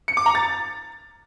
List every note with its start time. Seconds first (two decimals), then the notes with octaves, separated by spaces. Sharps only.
0.08 C#7
0.17 D6
0.26 A#5
0.35 A6